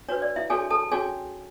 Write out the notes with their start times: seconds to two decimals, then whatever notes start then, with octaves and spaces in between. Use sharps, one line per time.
0.08 D4 F#4 B4 C#5
0.22 D5
0.36 E4 E5
0.50 D4 F#4 G#4 A4 C#5 G#5
0.70 A4 A5
0.91 C#4 F#4 G#4 C#5 G#5